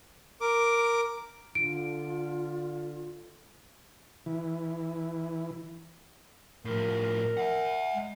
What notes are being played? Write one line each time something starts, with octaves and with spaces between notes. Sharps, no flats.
A#4 D6
D3 F4 D7
E3
A2 F3 A#4
E5 F#5
G#3